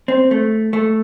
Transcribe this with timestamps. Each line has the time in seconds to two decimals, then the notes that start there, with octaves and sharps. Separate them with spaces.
0.08 C4
0.31 A3
0.73 A3